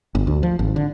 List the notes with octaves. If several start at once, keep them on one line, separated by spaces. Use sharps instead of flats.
G1
D2
F3
G#1
D3